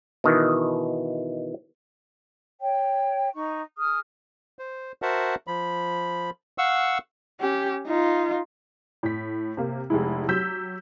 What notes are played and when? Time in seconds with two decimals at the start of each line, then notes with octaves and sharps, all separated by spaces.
0.24 B2 D#3 E3
2.60 C#5 G5
3.33 D#4 C#6
3.77 G#4 D#6 F6
4.59 C5
5.02 F#4 A#4 C5 E5 F#5 A5
5.47 F3 B5
6.58 F5 F#5 C#6 E6
7.40 C#4 G4
7.87 D#4 F4
9.03 A2 B6
9.57 C3 A#3
9.90 F1 G#3 E4
10.29 F#3 G4 E6 G6 B6